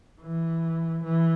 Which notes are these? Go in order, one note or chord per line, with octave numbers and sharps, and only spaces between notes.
E3
E3